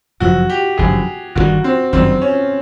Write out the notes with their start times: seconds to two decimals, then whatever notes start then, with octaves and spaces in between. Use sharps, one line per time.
0.20 G1 F#2 C#3 F3 F#4
0.50 G4
0.77 G1 F#2 C#3 F3 G#4
1.35 G1 F#2 D#3 G3 F#4
1.64 C4
1.93 G1 F#2 D#3 G3 C4
2.22 C#4